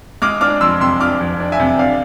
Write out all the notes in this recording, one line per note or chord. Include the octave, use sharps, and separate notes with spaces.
G#3 D6 F6
D4 D6 F6
F2 C6 E6
C3 C6 E6
D4 D6 F6
F2
D4
E5 G#5
C3
D3 D5 F5